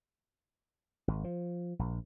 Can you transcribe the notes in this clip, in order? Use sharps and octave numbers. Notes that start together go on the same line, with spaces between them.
G#1
F3
A#1